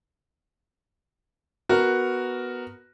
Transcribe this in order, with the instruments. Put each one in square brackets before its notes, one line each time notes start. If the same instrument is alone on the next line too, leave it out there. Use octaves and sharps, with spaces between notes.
[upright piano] B3 F#4 A#4